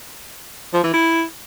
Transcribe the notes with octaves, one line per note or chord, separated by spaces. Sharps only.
F3
E3
E4